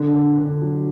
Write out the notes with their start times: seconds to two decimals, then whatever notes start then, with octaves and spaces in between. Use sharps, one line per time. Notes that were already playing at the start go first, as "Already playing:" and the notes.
Already playing: D3 D4
0.14 D3
0.38 D3
0.61 F#3